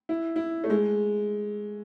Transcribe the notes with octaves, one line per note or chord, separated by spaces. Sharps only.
E4
E4
A3
G#3